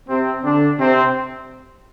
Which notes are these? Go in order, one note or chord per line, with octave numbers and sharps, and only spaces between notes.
C3 C4
D3 D4
C3 C4